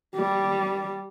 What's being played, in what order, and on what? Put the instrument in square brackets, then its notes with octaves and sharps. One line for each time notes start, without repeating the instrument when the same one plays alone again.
[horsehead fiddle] G3